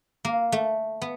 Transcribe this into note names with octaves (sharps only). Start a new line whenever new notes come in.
A#3
A3
B3